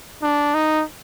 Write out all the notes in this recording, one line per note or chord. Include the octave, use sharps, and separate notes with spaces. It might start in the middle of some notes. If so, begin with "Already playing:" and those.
D4
D#4